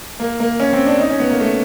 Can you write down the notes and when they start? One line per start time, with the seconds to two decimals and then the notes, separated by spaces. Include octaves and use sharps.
0.20 A#3
0.40 A#3
0.60 C#4
0.73 C4
0.86 D4
1.00 D#4
1.10 C#4
1.20 B3
1.29 A#3
1.40 A3